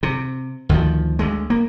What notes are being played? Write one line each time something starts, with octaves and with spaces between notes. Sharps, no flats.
C3
D2 D#3 F3
D2 G#3
A#3